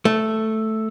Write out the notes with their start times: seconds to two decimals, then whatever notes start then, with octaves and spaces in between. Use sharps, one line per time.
0.05 A3